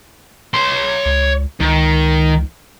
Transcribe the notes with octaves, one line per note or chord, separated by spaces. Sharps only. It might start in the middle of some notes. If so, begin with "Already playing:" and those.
C#5 C6
C#2
C#2 D#3